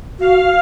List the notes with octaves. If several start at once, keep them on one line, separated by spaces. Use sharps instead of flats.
F#4 F5